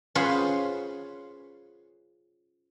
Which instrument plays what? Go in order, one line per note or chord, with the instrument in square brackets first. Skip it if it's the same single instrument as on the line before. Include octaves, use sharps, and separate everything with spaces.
[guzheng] C#4 F4 G#4 B4 C5 F#5